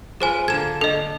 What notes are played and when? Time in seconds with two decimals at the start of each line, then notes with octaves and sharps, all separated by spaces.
0.20 F4 G#4 B4 C5 G#5
0.48 D3 A#3 A4 G#6 E7
0.81 D3 A4 D#5